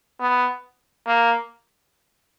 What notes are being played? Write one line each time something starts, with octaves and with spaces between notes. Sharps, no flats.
B3
A#3